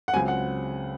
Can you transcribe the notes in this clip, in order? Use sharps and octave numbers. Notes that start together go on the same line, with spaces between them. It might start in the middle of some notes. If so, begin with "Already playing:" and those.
F#5
C#2 C#3 F#3 C4 G#5
F#5